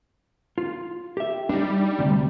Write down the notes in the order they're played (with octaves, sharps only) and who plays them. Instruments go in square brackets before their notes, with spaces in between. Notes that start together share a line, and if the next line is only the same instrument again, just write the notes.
[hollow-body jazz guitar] F4
G4 E5
[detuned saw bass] G3 [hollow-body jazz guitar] D4 D#4
[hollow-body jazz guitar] D2 C3